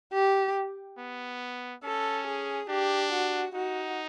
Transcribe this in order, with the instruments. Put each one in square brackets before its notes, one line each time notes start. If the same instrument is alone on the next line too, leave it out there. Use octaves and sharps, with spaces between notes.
[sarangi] G4
[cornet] B3
[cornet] C#4 [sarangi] A4
[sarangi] G#4
[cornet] D4 [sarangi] G4
[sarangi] F#4
[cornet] D#4 [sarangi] F#4